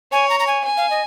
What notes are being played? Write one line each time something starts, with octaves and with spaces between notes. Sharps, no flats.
C#5 G#5
A#5
A#5
G#5
G#5
F5
D#5